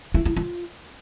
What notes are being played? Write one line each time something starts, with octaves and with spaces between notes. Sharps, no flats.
E4
E4
F4